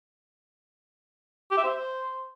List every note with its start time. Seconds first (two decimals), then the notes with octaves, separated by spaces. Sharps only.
1.51 G4
1.58 E5
1.64 C5